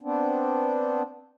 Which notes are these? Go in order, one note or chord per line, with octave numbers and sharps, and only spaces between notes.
B3 C4 D4